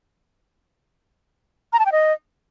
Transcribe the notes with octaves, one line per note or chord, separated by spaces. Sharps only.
A#5
A5
G5
D#5